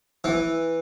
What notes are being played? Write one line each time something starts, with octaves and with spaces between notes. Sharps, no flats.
E3